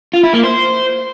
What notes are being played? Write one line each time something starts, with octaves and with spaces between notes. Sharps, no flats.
F4
E4
A#3
C5